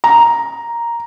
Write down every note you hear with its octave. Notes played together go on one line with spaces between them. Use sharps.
A#5